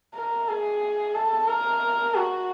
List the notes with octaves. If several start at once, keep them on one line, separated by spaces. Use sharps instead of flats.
A#4
G#4
A4
A#4
F#4